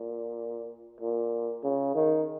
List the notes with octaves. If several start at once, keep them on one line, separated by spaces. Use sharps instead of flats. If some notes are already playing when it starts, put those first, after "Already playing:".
Already playing: A#2
A#2
C#3
D#3